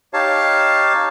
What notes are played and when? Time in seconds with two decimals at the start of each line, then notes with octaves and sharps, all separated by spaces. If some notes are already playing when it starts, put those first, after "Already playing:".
0.13 D#4 G4 C#5 F5 A5